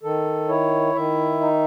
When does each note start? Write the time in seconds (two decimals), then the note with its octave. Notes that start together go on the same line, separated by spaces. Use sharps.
0.03 D#3 A4
0.48 E4 C#5
0.95 D#3 E5
1.41 D#4